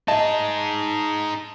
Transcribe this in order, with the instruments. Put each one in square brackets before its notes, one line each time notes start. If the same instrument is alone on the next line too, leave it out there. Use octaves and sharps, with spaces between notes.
[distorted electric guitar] D#4 G#4 [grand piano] D#5 [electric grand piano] A5